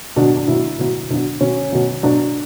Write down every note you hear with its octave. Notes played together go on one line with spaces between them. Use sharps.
B2 F#3 D4
D4
B2 F#3 E4
B2 F#3
B2 F#3 D4
B2 F#3 C#4
B2 F#3
B2 F#3 D4